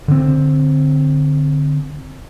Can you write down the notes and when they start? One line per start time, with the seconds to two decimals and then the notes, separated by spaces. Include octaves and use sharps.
0.08 D3 C4